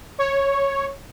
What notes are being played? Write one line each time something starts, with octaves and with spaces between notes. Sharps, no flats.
C#5